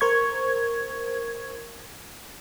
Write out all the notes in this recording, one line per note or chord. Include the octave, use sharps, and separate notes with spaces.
A#4 C5 C#6 G#6